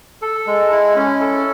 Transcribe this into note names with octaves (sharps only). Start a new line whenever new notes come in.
A4
G#3
E4
C#4
A4